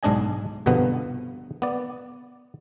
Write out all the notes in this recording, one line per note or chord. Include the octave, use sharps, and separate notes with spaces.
B1 G#2 G#3 D4 D#5 G#5
C2 G2 B2 D3 F3 B3
B3 D5